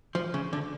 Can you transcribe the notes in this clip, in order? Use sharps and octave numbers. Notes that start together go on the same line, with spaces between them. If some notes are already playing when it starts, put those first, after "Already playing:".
F3
C#3
D3